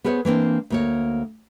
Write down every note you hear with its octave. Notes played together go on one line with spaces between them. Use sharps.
B3 G#4 A#4 C5 C#5
E3 A#3 C4 D4
D2 A#3 C#5